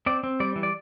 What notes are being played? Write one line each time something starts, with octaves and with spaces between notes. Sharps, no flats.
C4 D5
C4
G3 D5
E3
D5